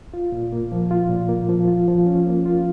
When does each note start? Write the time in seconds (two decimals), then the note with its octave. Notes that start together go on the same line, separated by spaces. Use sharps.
0.14 F4
0.32 A#2
0.52 A#3
0.72 F3
0.91 F4
1.09 A#2
1.29 A#3
1.49 F3
1.68 F4
1.88 F3
2.06 C#4
2.26 A#3
2.46 F4